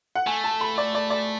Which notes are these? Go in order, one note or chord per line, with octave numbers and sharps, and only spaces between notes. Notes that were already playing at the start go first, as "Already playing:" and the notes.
F#5
A3 G#5
A5
B5
D5
D5
D5